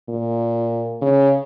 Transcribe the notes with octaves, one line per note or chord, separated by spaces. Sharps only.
A#2
C#3